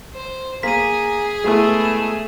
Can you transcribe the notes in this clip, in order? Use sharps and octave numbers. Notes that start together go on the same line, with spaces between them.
C5
A#3 G#4 B6 D#7
G#3 A3 B3 E4
E7